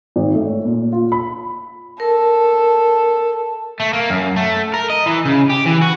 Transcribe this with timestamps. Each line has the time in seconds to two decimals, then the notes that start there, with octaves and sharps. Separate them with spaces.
0.16 G#1
0.35 A3
0.46 C#5
0.65 A#2
0.92 F4
1.12 B5
2.00 A4 A#4
3.80 A3
3.93 A#3
4.10 F#2
4.36 A3
4.74 A#4
4.90 D#5
5.06 E3
5.25 C#3
5.50 G4
5.66 E3
5.82 F#4